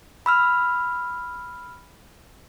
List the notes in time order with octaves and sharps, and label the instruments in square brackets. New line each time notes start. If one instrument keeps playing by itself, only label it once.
[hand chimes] B5 E6 F6